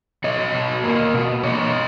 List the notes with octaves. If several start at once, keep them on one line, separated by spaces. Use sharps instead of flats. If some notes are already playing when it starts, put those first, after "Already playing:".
B2 C#5 D#5
B2
A#3
B2
A#3 C#5 D#5